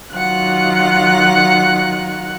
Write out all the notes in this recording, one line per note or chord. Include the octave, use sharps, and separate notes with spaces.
D#3 F#3 F4 F#5 F#6